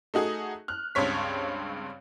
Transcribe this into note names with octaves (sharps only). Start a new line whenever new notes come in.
A3 D#4 F#4 G#4
F6 F#6
C#2 G2 C4 C#5 B6